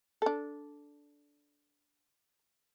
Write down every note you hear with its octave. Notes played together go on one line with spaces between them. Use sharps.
D4 A4